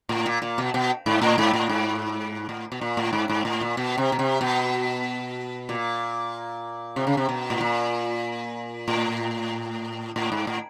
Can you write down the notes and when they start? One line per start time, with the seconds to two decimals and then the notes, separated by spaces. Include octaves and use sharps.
0.09 A2
0.26 A#2
0.42 A#2
0.58 B2
0.74 B2
1.06 G#2
1.21 A2
1.38 G#2
1.53 A2
1.69 G#2
2.49 A2
2.72 B2
2.81 A#2
2.97 A2
3.13 G#2
3.29 G#2
3.45 A2
3.61 A#2
3.77 B2
3.98 C3
4.12 B2
4.19 C3
4.41 B2
5.69 A#2
6.96 C3
7.07 C#3
7.17 C3
7.29 B2
7.50 A2
7.61 A#2
8.88 A2
10.16 A2
10.32 G#2
10.47 A2